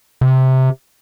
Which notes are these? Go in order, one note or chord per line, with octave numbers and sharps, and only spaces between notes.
C3